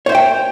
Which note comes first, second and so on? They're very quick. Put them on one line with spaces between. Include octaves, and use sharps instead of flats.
C#5 C5 E5 G5